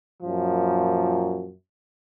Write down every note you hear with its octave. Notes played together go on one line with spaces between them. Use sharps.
F#2 A#2 F3